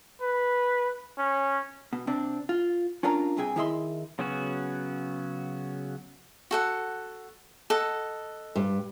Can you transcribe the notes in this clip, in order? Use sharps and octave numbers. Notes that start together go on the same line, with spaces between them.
B4
C#4
B2
C3 C4 D4
F4
C#4 D4 F4 A#4 A#5
C2 G2 C3 G#4 G5 G#5
D#3 E4 G#4 D#5 E5 C6
C#3 F#3 B3 C#4 F#4
F#4 A4 F#5
A4 D#5 F#5
G2